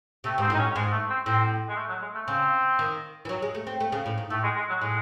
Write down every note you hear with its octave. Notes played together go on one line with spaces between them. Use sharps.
C3 A3
G#2 C4
A2
D#4
C#4
G#2 G#3
A3
C4
A2 C4
G#3
A3
F#3
G#3
A3
C#3 C4
D#3
E3
F#3
G#3
A3
C4
A3
C#3
A2
G#2
A2 A3
G#3
G#3
F#3
A2 G#3